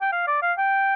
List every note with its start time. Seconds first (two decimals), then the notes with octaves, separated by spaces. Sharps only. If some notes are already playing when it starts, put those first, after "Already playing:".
0.02 G5
0.12 F5
0.27 D5
0.42 F5
0.58 G5